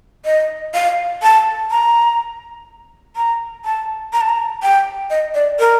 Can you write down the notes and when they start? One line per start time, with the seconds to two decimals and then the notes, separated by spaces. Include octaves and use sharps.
0.25 D#5
0.74 F5
1.22 A5
1.71 A#5
3.16 A#5
3.65 A5
4.13 A#5
4.21 A5
4.29 A#5
4.62 G5
5.10 D#5
5.34 D5
5.59 A#4